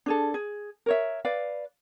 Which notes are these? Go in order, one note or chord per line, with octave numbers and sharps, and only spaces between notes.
D4 G#4 A4
G#4
A#4 C#5 E5
B4 D5 F5